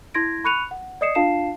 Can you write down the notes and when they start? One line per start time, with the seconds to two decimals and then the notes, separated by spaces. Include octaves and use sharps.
0.14 E4 C6 G#6 A#6 D7
0.44 B5 C#6 F#6 C#7 D#7 F7
0.71 F#5
1.01 D5 D#5 D#6 C7 C#7 E7
1.15 D4 F4 F5 A5 C7 E7